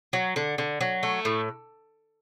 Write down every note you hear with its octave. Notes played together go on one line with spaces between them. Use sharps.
F#3
D3
D3
F#3
A3
A2